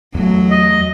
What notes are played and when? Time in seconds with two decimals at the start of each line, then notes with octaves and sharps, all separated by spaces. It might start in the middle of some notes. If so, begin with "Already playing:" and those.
0.14 E2 F#3 A3
0.51 D#5